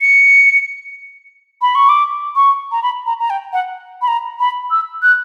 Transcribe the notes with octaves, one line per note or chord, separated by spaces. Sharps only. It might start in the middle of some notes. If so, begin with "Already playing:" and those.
C#7
B5
C#6
D6
C#6
A#5
B5
A#5
A#5
G5
F#5
B5
A#5
B5
E6
F#6